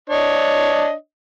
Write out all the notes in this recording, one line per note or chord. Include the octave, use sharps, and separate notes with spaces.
D4 C#5 D#5